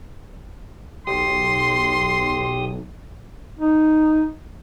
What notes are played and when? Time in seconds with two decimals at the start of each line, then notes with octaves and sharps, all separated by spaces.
1.07 B1 G4 C6 D#6
3.59 D#4